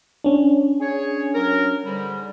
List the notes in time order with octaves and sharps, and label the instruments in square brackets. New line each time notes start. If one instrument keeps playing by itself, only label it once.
[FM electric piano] C#4 D4
[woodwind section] G#4 C#5
F#3 A#4
G#2 D3 G3